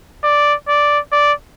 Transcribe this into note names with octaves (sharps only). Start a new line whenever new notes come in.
D5
D5
D5